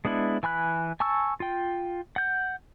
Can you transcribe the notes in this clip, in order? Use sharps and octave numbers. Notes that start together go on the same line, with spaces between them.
G#3 B3 D4 E4
E3 G#5 B5 F#6
G#5 A5 C#6 E6
F4 G5
F#5 G6